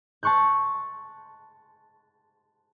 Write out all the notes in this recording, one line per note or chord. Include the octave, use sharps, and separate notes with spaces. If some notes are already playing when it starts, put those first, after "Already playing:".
A5 C6 C#6 F#6 G6